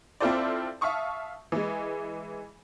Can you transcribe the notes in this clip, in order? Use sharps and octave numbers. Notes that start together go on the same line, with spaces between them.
C4 E4 F4 A4 C5 D5
E5 F5 A5 C#6 D#6
E3 G#3